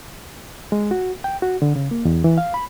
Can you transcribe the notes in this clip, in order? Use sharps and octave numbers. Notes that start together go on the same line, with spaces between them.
G#3
F#4
G5
F#4
D3
C#3
A#3
E2
E3
F5
B5